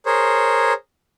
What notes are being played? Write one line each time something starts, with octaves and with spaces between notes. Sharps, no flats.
G#4 A#4 C5 C#5